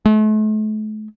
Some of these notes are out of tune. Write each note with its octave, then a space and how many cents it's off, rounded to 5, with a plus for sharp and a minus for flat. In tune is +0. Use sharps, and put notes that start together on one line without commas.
A3 -40